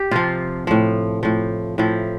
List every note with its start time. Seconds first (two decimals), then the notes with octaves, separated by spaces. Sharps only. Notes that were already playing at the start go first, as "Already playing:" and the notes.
Already playing: G4
0.11 C3 F3 F4
0.67 A2 F3
1.23 A2 F3
1.78 A2 F3 E4